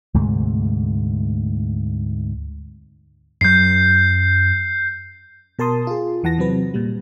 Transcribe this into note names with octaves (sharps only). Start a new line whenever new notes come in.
D2 G#2 C3 A3
F#2 F#3 G6 C7
B2 A#4 A5 C6 D#6
F4 G#4
E2 E3 F#5 A5 A#6
C3 F#3 C4 B4
A#2 G3